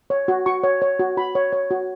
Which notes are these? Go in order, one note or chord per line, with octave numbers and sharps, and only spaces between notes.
C#5
F#4
F#4 C#6
C#5
C#5
F#4
F#4 B5
C#5
C#5
F#4